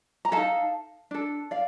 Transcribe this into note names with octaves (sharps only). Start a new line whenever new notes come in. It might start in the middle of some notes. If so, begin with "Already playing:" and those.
A#5
D#4 A4 F5 A5
D4 A4
D5 F5